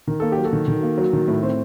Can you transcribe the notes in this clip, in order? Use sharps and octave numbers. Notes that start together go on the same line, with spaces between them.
D#3 A#4
A#3 A4
G4
F#3
F#4 A4
D#3
D#3
A#3
F#3
D#3
A2
C4